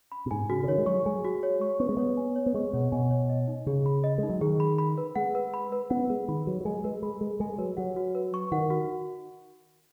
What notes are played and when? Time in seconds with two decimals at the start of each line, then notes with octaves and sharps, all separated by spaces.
0.12 B5
0.26 B2
0.31 G#2 G#5
0.50 C#3 F#4
0.63 C#3
0.68 D#3 C#5
0.78 G#3
0.86 F#3 C#6
1.06 G#3 G#5
1.25 F#4
1.43 C#5
1.61 C#6
1.80 B3 C#6
1.89 G#3
1.97 B3 C#5
2.17 G#5
2.36 C#5
2.46 B3
2.54 G#3 C#6
2.73 B2 C#5
2.92 B2 G#5
3.10 C#5
3.29 D#5
3.48 D#4
3.66 C#3 G#4
3.86 B5
4.04 D#5
4.18 G#3 D#4
4.29 F#3
4.41 D#3 G#4
4.60 B5
4.78 B5
4.98 B4
5.16 G#3 F#5
5.35 B4
5.54 B5
5.72 B4
5.90 B3 F#5
6.10 G#3 B4
6.28 D#3 B5
6.47 F#3 B4
6.61 F#3
6.65 G#3 G#5
6.84 G#3 B4
7.02 G#3 B5
7.21 G#3 B4
7.40 G#3 G#5
7.58 F#3 B4
7.77 F#3 F#5
7.96 F#4
8.15 B4
8.34 C#6
8.52 D#3 F#5
8.70 F#4